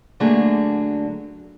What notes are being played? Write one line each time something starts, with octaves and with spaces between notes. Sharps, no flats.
D3 F#3 A3 A#3 D4 G#4